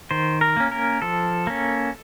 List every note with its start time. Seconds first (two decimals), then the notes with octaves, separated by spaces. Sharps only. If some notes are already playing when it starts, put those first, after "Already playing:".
0.11 D#3 C5
0.41 A#4
0.57 A#3 C#4
0.71 A#4
1.02 F3 A4
1.47 A#3 C#4